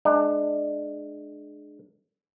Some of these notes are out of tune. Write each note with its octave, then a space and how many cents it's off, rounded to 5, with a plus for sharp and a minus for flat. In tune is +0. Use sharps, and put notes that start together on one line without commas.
G#3 +20 D4 +25